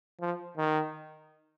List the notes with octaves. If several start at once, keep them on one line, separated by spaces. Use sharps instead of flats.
F3
D#3